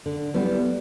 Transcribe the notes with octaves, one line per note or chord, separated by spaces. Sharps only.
D3
G3 B3 E4